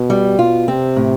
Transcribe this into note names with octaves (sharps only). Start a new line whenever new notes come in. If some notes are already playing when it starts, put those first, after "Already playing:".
Already playing: B2
G3
B2 F4
C3 C4
A2